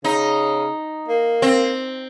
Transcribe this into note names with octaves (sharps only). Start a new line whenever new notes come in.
C#3 D#4
A#3
C4